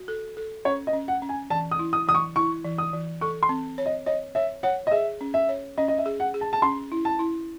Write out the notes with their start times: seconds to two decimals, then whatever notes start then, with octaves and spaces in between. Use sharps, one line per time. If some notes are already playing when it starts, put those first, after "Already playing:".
Already playing: F#4
0.08 A4
0.37 A4
0.65 C#4 C#5
0.87 D#5
0.93 C#4
1.08 F#5
1.22 C#4
1.29 G#5
1.50 E3 A5
1.71 D#6
1.79 E4
1.93 D#6
2.07 E3 D#6
2.15 C#6
2.36 E4 C#6
2.64 E3
2.78 D#6
2.93 E3
3.21 A4 C#6
3.43 C6
3.49 C4
3.78 C#5
3.86 D#5
4.06 C#5 D#5
4.35 C#5 E5
4.63 C#5 F#5
4.87 D#5
4.91 G#4 E5
5.21 C#4
5.34 E5
5.49 C#5
5.78 C#4 D#5
5.88 D#5
5.98 E5
6.06 G#4
6.20 F#5
6.34 G#4
6.41 A5
6.53 A5
6.62 C#4 C6
6.92 E4
7.05 A5
7.19 E4